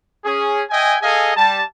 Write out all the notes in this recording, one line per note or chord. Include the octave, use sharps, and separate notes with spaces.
C#4 G#4
D#5 E5 G5 G#5
G#4 A4 D#5 F5 G#5
G3 A5